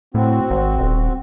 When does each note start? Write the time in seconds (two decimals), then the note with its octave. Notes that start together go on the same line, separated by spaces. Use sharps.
0.14 A2 C4 F#4
0.50 G#1
0.79 D#1